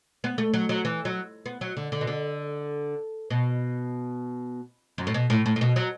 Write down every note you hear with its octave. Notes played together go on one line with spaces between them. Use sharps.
B3
A3
F#3
F#3
E3
F#3
B3
F#3
D3
D3
B2
D3
B2
F#2
A2
B2
A2
A2
A2
B2
F#3